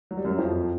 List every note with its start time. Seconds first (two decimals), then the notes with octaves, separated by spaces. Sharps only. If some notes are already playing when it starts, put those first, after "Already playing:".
0.11 F#3
0.17 G3
0.25 F#2 F#3
0.38 F2 F3